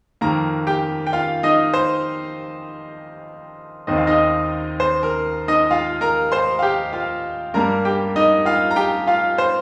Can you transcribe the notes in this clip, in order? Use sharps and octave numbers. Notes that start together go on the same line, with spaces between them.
F2 D#3 A#3 A#4 A#5
G4 G5
G5
F4 F5
D#4 D#5
C5
D#2 D#3 C4 D#5
F5
D#4 D#5
C5
A#4
D#4 D#5
F4 F5
A#4 A#5
C5 C6
F5
G4 G5
F4 F5
G2 G3 A#3 A#4 A#5
G4 G5
D#4 D#5
F4 F5
A#5
G4 G5
F4 F5
C5